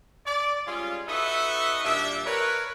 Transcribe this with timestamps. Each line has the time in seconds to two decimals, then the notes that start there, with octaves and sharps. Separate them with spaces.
0.26 D5
0.67 G3 G#3 C#4 F4
1.08 D#4 F#4 A4 B4 D#5 E5
1.85 A#2 G3 D4 E5
2.26 A#4 B4 C#5